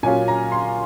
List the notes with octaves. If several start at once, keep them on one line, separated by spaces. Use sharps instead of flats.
A#2 F#3 C#4 F4 G#5
A#5
C6